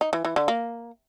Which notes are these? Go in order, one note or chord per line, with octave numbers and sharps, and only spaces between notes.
D#4
E3
E3
D3
A#3